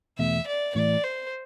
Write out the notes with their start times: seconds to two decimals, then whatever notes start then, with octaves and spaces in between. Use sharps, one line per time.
0.19 E2 B2 A3 E5
0.47 D5
0.75 A1 A2 E3 A3 D5
1.04 C5